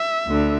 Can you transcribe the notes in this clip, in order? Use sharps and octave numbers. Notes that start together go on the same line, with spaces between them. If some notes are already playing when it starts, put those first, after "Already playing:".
Already playing: E5
D2 D3